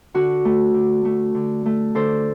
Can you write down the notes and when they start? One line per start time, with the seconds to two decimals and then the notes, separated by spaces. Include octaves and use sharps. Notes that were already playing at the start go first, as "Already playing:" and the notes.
0.14 D3 F#4
0.45 A3
0.74 D3
1.05 A3
1.35 D3
1.66 A3
1.95 D3 A4 C5